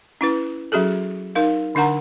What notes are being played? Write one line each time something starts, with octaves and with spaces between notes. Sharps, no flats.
C#4 E4 B4
F#3 C#4 F#4 G#4 A4
D#4 A#4 F5
D3 D4 A#4 F#5 A#5